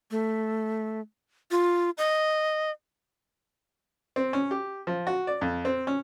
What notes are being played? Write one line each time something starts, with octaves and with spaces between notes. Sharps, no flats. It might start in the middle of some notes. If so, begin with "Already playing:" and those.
A3
F4
D#5
C4
C#4
G4
F3
F#4
D5
F2
C4
C#4